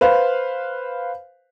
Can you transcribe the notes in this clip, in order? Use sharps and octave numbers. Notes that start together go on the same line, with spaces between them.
B4 C5 F5